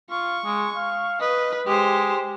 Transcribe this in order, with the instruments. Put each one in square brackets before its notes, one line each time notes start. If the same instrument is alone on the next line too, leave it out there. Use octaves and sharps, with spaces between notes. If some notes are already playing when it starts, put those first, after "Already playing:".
[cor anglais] F4 [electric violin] C#6
[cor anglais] G#3
F5
[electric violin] B4 [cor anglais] D#5
[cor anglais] G#3 [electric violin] G4 C5